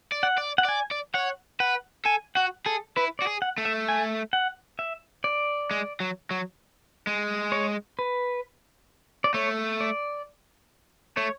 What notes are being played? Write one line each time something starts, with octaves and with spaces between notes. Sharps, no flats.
D5
F#5
D5
F#5
D5 G#5
D5
C#5 F#5
B4 F#5
A4 G#5
F#4 F#5
G#4 A4
E4 B4
D5
F#4
G#4
F#5
A3
E5
G#5
F#5
E5
D5
G#3
F#3
F#3
G#3
C#5
B4
D5
A3 C#5
D5
A3 C#5